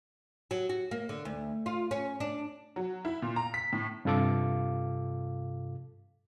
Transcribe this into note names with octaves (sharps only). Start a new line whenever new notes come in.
F#3
F#4
A#3
D3
D2
F4
C#4
D4
F#3
E4
A#2
A#5
B6
A2
G2 C3 F4 A4 F5 D6